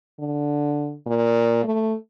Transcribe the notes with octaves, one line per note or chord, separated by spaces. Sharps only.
D3
A#2
A3